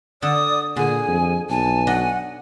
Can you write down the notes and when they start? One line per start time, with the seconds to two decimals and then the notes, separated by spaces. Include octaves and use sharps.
0.22 D3 A4 D5 D#6
0.76 A#2 D3 G#4 G#5
1.08 F2
1.50 B1 G#5 A5
1.87 D4 D#5 F#5